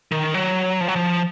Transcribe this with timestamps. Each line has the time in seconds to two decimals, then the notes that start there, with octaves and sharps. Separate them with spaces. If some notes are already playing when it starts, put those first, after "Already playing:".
0.12 D#3
0.34 F#3
0.81 F3
0.88 F#3
0.96 F3